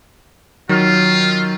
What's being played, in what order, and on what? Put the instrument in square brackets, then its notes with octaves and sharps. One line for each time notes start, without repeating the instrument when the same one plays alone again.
[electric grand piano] D#3 F#3 [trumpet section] F4